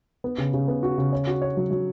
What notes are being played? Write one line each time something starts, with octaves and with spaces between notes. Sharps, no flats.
B3
C#3
C#3
B3
F#4
C#3
C#5
F#4
C#5
F#3
F#3